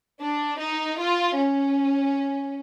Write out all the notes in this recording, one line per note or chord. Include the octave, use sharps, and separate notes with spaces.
D4
D#4
F4
C#4